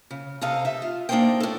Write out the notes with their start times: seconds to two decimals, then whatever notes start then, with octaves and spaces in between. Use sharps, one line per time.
0.11 C#3
0.41 C3 C4 A4 D#5 F5
0.65 D#4 E5
0.82 F4
1.09 A#3 D4 D#4 A4 C5 G5
1.40 A2 A4